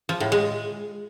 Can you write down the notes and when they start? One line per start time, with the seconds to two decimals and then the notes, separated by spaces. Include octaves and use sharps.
0.09 F3
0.20 A2
0.32 G#3